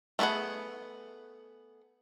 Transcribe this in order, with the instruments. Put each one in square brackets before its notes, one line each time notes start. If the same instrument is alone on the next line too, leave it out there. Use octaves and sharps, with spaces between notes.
[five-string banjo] A3 B3 D#4 G#4 F#5